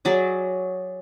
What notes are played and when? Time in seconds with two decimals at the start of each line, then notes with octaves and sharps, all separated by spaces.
0.05 F#3 G#4 D5